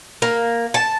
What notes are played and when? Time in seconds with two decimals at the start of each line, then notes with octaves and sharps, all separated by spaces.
0.22 A#3
0.74 A5